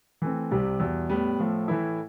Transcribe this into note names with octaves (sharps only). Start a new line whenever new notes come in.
E3 A3 C4
C2 C3 G3
E2 B2 G3
A2 G3 B3
A2 F3 A3
A2 E3 A3 E4